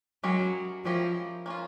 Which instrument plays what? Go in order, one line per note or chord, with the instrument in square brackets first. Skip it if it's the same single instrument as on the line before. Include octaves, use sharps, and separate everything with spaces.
[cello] F#3 [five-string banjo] G#3 C#4 E4 G4 A#4
[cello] F3 [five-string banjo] G#3 C#4 E4 G4 A#4
[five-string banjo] A#3 C#4 F4